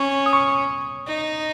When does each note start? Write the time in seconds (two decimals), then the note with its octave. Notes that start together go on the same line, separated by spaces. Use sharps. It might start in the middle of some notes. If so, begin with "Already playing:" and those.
Already playing: C#4 C#6
0.26 D#6
0.33 C#6
1.07 D#4